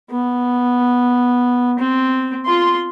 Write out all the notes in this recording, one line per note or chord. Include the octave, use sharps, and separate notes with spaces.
B3
C4
F4 C6